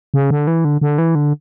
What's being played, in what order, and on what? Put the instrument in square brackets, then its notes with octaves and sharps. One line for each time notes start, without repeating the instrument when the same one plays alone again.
[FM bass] C#3
D3
E3
D3
D3
E3
D3